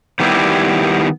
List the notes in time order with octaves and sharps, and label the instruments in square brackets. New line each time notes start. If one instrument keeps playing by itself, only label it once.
[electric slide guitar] D#3 G3 B3 C4 E4 G4